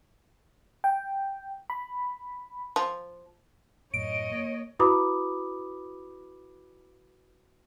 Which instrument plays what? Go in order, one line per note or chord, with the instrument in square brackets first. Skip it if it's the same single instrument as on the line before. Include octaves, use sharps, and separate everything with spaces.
[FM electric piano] G5
B5
[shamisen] F3
[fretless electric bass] F#2 A2 [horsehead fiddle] C#5 D#5 [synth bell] D7
[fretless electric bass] A#3
[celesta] E4 F#4 B4 B5 D6 D#6